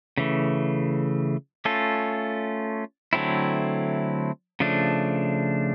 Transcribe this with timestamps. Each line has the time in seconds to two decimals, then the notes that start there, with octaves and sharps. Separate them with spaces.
0.18 C#3 E3 A3
1.65 A3 C#4 F4 A4
3.13 D3 F#3 A3 C4 E4
4.60 C#3 F3 A3 D4